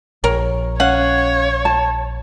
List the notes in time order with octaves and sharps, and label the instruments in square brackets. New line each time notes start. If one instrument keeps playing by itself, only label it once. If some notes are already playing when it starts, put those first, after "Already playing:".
[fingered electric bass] A#1 [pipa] A#4 [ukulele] C#5
[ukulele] C#4 F5 [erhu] C#5 [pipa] F#5
[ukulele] A5